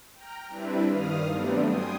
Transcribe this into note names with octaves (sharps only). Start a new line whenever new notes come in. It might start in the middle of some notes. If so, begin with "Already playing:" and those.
G5 A#5 F6
G3 C4 D4 E4 B4
G2 D#3 F5 D#6 F6
F#3 G3 A3 B3 C4 D4
G5 G#5 C6 D#6